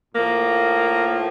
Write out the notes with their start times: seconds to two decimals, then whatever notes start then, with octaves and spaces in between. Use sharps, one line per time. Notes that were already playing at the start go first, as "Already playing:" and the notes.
0.15 A2 F3 A#3